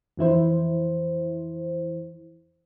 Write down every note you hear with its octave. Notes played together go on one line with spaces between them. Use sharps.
F2 E3 E4 C5